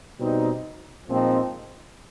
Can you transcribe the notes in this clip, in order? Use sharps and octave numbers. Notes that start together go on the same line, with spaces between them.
B2 G3 C4 D#4
A#2 F3 G#3 C4 D#4